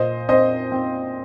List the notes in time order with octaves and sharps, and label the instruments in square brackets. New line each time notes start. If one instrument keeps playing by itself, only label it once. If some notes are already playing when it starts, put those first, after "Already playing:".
Already playing: [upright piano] A#2 C5 D#5
C4 C5 D#5
C4